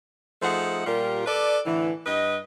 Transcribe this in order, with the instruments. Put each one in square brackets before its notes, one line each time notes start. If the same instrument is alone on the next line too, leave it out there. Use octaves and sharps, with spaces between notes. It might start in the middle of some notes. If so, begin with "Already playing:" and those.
[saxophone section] F3 A3 D#4 G#4 F#5
A#2 G3 F4 G4 A#4
A4 B4 D5
A2 D3 E3
G2 B4 D#5